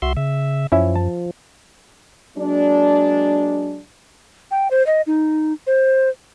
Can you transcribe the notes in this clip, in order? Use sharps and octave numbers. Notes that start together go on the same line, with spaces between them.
C2 F#4 E5 C6
C#3 E5
F#2 F3 C#4 E4 E5
A5
F#3 G#3 A#3 D4
G5
C5
D#5
D#4
C5